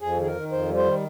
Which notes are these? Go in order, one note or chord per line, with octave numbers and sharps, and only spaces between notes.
F2 G#4
D#3 G#4
A#4
D#3
F2 C5
G3
C5
D#3